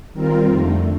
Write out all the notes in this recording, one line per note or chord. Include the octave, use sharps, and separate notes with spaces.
D#3 G3 C4 F4 A#4
F2 D3 A3